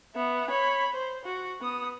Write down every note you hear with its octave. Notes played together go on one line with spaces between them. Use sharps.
B3 E5
C#5 B5
C5
F#4
B3 D#6